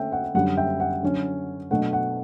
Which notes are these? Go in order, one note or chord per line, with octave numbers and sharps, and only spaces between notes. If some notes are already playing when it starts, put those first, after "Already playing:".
Already playing: D3 A3 C#4 E5 G5
F#5
F#2 D3 G3 D4 F#5
E5 G5
F#5
D3 F#3 C#4
B2 F#3 A3 D4 F#5
F#5